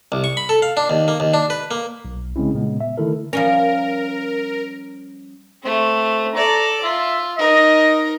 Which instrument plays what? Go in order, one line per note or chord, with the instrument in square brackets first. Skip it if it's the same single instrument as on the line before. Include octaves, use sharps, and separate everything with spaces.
[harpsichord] C2
C#6
B5
A4
F5
D4
D#2
A#3
D#2
D4
B4
A#3
[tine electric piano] B1
C#3 G#3 C4 C#4 E4
A#2 C#3 G#3 B3
E5
D3 D#3 A3 E4 A4 A#4
[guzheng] F3 G3 C#4 [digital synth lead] A#4
[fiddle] A3 C4
[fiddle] A4 D5 [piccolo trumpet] A#5
[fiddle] F4 [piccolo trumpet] E5
[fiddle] D#4 A#4 [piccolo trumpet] D#5